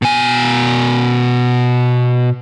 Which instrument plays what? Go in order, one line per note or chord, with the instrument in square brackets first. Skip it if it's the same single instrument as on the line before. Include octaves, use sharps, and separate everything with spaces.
[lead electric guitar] B2 G#5